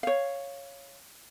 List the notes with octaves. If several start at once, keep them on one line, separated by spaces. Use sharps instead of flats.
C#5 F5